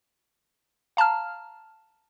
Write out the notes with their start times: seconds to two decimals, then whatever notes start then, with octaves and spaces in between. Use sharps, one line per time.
0.97 F5 A5 A#5 F6